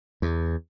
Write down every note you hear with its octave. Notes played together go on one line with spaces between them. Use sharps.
E2